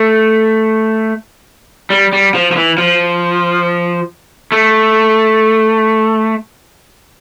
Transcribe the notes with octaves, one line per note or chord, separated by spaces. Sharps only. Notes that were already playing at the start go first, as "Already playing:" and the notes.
Already playing: A3
G3
G3
F3
F3
E3
F3
A3